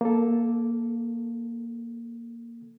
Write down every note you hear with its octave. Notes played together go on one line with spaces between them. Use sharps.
A#3 A4